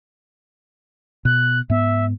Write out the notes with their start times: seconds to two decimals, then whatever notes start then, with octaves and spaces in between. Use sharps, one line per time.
1.25 B2 F#6
1.70 G#2 B3 E5